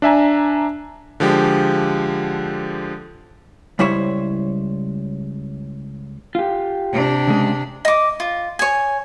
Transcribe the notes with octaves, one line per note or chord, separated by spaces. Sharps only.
D4 E5 G#5 A#5
D3 F3 G#3 G4
C#2 G3 E4 C5 C#5
F4 G4
C3 D4
C#3 G#3
D#5 D6
F4
C#5 G#5